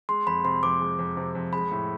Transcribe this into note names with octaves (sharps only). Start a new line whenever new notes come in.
G#3 C6
F2 B5
C3 C6
F2 D6
G#3
F2
C3
F2
G#3 B5
A2